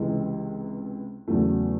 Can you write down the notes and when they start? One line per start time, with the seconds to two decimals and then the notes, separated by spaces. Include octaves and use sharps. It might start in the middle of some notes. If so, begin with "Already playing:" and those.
Already playing: C#2 C3 E3 G#3
1.28 E2 C#3 F#3 A3